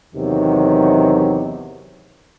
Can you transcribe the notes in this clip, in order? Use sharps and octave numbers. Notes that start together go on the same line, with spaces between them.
E2 C3 D#3 F#3